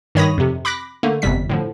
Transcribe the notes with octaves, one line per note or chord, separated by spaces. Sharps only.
G2 D#3 C#5 B5 D#6 A#6
F2 C3
B5 D6 F#6 A#6 B6
D3 A3 A#3
G1 F2 C3 G3 B6
A2 D3 F3